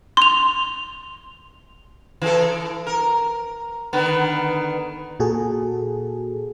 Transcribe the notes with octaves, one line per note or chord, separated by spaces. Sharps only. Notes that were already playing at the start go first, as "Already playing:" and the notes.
C6 F7
E3 A4
A#4
D3 D#3 B3
A#2 F#4 G#4 A4